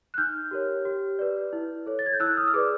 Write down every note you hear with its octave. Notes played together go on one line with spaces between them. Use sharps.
F#6
D#4 F6 G6
G4 A#4 C#5
G4
B4 D5
E4
A4 C#5
A6
G#6
G6
E4 E6 F#6
D#6 F6
F6
G#4 B4 D5 D6 E6